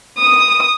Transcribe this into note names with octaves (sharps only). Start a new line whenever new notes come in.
D#6